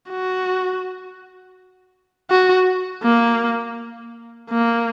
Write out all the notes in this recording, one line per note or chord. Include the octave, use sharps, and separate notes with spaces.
F#4
F#4
A#3
A#3